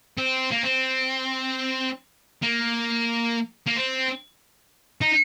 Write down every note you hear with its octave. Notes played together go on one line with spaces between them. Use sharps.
C4
A#3
C4
A#3
A#3
C4
D#4